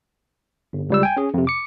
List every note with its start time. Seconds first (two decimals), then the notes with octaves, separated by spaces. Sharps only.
0.73 G1
0.90 C#2 G3 E6
1.03 G5 G#5
1.17 C#4 G#4
1.34 F2 C3
1.47 D6 C#7